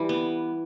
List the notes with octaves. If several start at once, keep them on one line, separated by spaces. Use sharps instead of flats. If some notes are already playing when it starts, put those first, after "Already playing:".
Already playing: E3 G3
B3